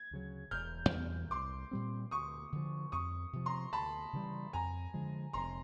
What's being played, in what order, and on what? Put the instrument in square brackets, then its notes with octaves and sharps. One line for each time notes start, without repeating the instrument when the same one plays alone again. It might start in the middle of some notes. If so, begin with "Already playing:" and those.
Already playing: [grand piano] G#6
[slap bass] D2 C#3 F#3
[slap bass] E1 [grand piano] F6 G6
[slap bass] E2 B2 G3
[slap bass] C2 [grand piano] C6 D6
[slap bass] A#2 G3 C4
[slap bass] D2 [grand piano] C#6 D#6
[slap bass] D3 F3
[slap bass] F2 [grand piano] C#6 D#6
[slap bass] C3 F3
[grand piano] A#5 C6
[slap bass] D2 [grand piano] A5 B5
[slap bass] C#3 E3 G3
[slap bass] F2 [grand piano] G#5 A#5
[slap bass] D3 F3 G#3
[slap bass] F1 [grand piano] A#5 C6